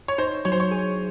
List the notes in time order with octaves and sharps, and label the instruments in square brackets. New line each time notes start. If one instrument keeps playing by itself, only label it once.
[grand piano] C#5
[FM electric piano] D#4 [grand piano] C5
[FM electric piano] F#3 [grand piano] C#5
[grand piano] C5
C#5
[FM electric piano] G#4